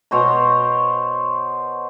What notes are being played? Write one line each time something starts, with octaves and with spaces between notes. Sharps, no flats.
B2 C5 C#5 A#5